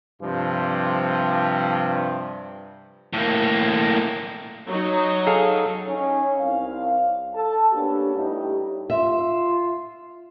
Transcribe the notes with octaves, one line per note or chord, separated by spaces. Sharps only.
G2 C3 F3
A2 A#3
F#3 D#4
G#4 A4 F5
C#4 D#4 C#5
C2 F5
A4 A5
A#3 B3 C#4 D4 G4
A2 G3 D#4 G4
F4 E5